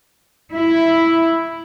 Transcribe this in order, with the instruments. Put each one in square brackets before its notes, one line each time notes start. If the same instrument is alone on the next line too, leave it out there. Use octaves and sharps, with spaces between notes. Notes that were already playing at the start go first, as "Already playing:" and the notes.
[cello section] E4